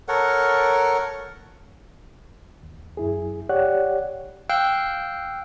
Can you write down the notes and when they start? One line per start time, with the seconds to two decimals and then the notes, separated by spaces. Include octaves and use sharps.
0.08 A4 A#4 C#5 F#5
2.63 D#2
2.97 F#2 E4 G#4
3.49 G4 C#5 D5 F#5 F#6
4.50 F5 G5 E6 F#6 G6